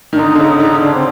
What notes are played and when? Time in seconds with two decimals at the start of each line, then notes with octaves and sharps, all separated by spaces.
0.12 D#3 D4
0.18 D3 D#4
0.35 D3
0.40 C#3 D#4
0.60 D3 D#4
0.81 D3 D4
0.93 C4